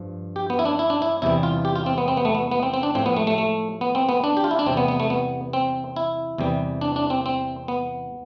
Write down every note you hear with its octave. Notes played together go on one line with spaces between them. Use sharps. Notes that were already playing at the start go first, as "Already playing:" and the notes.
Already playing: G2 F3
G4
B3
E4
D4
E4
D4
E4
E2 C3 E3 G3 E4
F4
G4
F4
C4
B3
C4
B3
A3
B3
B3
C4
C4
D4
A2 F3 C4
B3
A3
A3
A3
B3
C4
B3
D4
G4
F4
E4
D4
E2 C3 G3 C4
B3
B3
A3
B3
C4
E4
E2 C3 E3 G3
D4
D4
C4
C4
B3